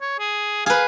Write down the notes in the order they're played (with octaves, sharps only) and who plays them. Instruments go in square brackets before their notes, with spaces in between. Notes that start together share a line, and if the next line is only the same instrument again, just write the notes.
[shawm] C#5
G#4
[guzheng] G#4 B4 [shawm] F5